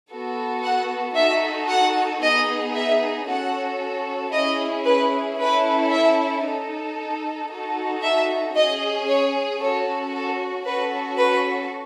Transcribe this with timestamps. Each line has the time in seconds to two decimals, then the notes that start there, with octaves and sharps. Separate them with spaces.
0.10 B3 F#4 A4
0.63 F#5
1.15 D#4 F#4 A4 E5
1.68 F#5
2.21 B3 D#4 G#4 D#5
2.74 E5
3.26 C#4 F#4 A4 F#5
4.32 C#4 E4 G#4 D#5
4.85 B4
5.38 C#4 E4 A4 B4
5.91 E5
6.43 D#4 A4
7.49 D#4 F#4 A4
8.02 E5
8.55 C#4 G#4 D#5
9.08 C#5
9.60 C#4 F#4 A4 C#5
10.13 A4
10.66 C#4 F#4 A4 B4
11.18 B4